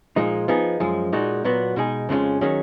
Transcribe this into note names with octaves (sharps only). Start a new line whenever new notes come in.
A#2 F3 G#3 D#4
F3 B3 D#4 G#4
F#2 F3 G#3
A#2 G#3 D#4 F#4
A#2 F#3 B3 F#4
B2 G#3 D#4 G#4
F2 C#3 F3 G#3 C#4
D#3 F#3 C#4 G#4